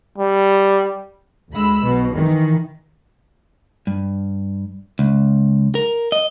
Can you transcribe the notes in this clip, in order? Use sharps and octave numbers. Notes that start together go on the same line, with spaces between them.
G3
D2 G#3 B5 E6
B1 B2
D#3 E3
G2
C#2
A#4
D#5